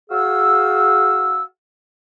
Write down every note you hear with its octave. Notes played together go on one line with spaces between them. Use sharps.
F#4 G#4 F5 E6